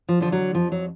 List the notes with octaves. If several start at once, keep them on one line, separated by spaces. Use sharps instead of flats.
F3
D3 F3
F#3
F2 F3
F#3